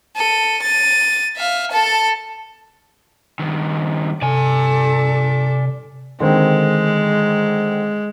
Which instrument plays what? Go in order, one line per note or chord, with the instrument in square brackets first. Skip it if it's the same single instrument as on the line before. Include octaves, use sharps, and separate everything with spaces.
[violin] A4 D#7
A6 D#7
E5 F5
A4 A5
[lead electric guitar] G2 D#3
[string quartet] G2 A4 D6 [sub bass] C3 [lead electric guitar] D5 G#5
[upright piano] D3 D#3 C4 [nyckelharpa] G#3